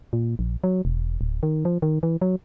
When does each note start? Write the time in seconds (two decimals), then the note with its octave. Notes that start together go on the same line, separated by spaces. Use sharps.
0.13 A#2
0.39 A#1
0.64 F#3
0.85 E1
1.21 D1
1.43 D#3
1.65 F3
1.82 D#3
2.03 E3
2.22 F#3